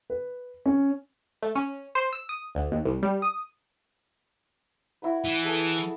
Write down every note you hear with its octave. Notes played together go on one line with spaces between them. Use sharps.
B4
C#4
A3
C#4
C5
E6
D#6
D2
D#2
C2
G3
D#6
E4 F#4 B4
E3
G#4 A4 A5